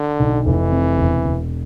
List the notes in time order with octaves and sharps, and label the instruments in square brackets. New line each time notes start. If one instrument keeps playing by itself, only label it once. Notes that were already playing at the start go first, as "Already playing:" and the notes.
Already playing: [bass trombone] D3
[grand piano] B1
[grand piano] F1 [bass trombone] E3
[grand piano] C3
E1
E1